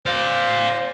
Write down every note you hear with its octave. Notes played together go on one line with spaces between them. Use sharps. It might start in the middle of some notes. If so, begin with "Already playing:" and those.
C5 D5 F5